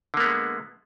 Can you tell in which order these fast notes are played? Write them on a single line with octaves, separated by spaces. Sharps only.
D3 A#3 B3 G#3